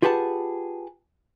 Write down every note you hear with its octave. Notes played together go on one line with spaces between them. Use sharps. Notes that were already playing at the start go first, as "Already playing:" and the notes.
F4 G4 G#4 B4 F#5 A5